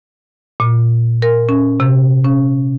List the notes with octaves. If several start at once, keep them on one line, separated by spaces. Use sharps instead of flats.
A#2
A#4
C#4
C3
C#4